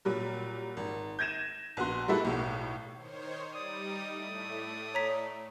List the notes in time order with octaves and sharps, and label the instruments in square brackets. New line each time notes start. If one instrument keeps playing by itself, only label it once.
[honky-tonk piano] A#2 F#3 G3
G#1
G6 G#6 A#6 D#7 E7
A#1 B3 F#4 C6
G3 G#3 A#3 E4 F#4 A4
B1 A2
[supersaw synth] D#3 C5 C#5
[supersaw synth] G3 D#4 [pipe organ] D5 D#6
[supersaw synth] A2 A3
[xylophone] C#5 A#5 B6